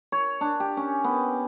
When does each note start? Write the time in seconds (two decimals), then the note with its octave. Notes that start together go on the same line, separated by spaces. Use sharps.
0.12 C#5
0.41 D4
0.60 G4
0.77 C#4
1.04 B3